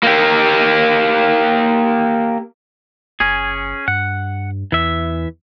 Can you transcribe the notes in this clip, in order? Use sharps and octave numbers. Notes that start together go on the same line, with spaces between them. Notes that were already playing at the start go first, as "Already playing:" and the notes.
A#3 G4
F#1 C#4 G#4
G2 F#5
E2 E3 E5